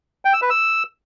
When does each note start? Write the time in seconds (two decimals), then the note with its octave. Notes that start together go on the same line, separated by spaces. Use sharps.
0.25 G5
0.33 E6
0.42 B4
0.50 E6